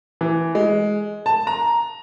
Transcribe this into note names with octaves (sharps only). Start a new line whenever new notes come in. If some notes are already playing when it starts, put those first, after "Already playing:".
E3
G#3
A5
A#5